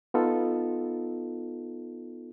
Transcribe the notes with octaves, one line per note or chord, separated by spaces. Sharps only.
B3 D#4 F4 A4